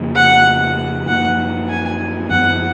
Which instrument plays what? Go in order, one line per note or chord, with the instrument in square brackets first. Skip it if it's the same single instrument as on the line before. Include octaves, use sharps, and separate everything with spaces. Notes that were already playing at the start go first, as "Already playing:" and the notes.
Already playing: [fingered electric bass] F2 C#3 F3 A#3
[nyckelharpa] F#5
[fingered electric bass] F#2 F3 A#3 [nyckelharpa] F#5
[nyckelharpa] G#5
[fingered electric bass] F#2 F3 B3 [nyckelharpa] F#5